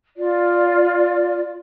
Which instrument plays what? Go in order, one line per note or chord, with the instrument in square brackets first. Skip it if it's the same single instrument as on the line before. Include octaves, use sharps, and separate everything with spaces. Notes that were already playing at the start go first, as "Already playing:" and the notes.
[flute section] F4 D5